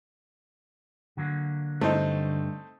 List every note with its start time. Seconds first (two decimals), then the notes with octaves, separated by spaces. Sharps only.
1.17 D3 F#3 A#3
1.81 D2 G2 A3 C4 D#4